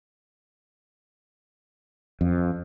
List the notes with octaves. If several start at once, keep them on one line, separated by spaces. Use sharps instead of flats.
F2